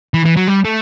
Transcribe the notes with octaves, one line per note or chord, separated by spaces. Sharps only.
E3
E3
F#3
G3
A3